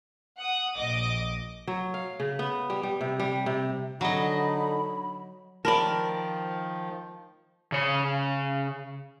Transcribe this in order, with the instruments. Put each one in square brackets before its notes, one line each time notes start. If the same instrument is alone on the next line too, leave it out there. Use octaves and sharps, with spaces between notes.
[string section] F#5 D#6
A#1 D#5 D6
[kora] F#3
F5
C#3
B3
G3
G3
C3
G3
C3
[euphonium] D3 [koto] F#3 D#5 [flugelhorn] D#4 [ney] B5
[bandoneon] D#3 F3 [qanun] A#4 D5 [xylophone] A5 B5
[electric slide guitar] C#3 C#5